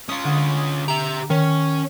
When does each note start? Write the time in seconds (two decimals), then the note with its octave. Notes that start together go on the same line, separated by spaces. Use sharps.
0.09 C#4 F4 D#6
0.24 D3 F#5 C#6
0.88 G4 E5 A#5
1.30 D#3 C#4 C#5